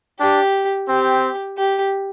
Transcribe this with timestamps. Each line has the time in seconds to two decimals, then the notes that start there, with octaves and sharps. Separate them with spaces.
0.20 D4 G4
0.89 C4 G4
1.58 G4